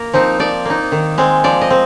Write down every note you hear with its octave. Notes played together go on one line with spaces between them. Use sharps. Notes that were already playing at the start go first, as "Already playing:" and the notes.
Already playing: A#3 A#4
F3 C4 D#4
F3 D5
A#3 D#4
D#3
G#3 C4
F3 D5
D#5
C4